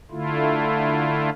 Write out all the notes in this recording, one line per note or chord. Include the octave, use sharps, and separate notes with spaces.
D3 A3 E4 F4